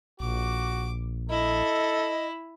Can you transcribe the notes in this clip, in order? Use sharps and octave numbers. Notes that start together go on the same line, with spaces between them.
A#1 F#4 D6
E4 A4 D#5